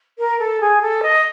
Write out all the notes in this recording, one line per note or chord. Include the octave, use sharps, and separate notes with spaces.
A#4
A4
G#4
A4
D#5